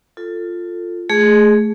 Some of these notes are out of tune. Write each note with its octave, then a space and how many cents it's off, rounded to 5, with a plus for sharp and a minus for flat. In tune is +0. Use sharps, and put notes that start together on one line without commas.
F4 +0 A4 +15
A3 -20 G#4 +0